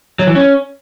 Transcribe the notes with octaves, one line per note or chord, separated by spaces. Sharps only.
F#3
E3
C#4